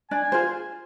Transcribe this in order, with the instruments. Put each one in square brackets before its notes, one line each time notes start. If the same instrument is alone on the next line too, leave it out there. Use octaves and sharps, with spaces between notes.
[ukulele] D4 [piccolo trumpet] G#5
[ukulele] F4 G#4 C5